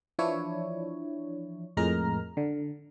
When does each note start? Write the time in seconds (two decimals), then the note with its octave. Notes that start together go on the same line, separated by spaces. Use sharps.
0.19 E3 F3 D4 E4 C#5
1.77 F2 A2 G#3 A#4 A#5 F6
2.37 D3